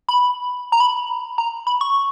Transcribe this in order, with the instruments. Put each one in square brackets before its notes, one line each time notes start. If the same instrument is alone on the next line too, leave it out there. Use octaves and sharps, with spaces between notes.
[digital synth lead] B5
A#5
B5
A#5
B5
C#6